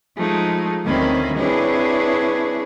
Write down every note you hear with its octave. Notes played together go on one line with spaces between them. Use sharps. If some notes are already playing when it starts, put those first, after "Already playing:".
F3 G#3 A3 D#4
D2 D#3 C4 C#4 B5
C4 D4 E4 G#4 B4 C#5